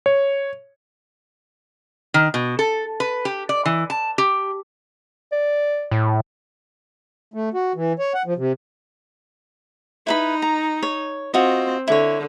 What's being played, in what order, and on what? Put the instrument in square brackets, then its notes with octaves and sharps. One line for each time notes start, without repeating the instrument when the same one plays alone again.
[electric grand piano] C#5
[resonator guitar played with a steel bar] D#3
B2
A4
B4
G4
D5
E3
A5
G4
[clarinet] D5
[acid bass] A2
[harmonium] A3
F#4
E3
C#5
F#5
F3
C3
[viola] D#4 [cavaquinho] E4 B4 B5
[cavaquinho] A#5
C#5
[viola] C4 [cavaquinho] F4 F#4 D#5
[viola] D3 [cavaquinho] E4 C#5